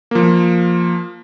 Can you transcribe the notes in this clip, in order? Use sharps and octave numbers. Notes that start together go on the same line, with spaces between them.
F3 A#3